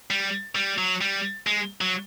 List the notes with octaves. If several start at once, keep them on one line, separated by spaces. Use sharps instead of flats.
G3
G3
F#3
G3
G#3
F#3